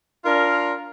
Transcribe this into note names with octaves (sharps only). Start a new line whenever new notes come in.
D4 F4 A#4